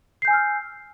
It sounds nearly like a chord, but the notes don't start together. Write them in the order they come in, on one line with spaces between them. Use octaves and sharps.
C7 G6 G#5 E6 F6